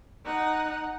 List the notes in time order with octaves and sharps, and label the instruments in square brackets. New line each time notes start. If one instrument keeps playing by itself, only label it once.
[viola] D#4 F#5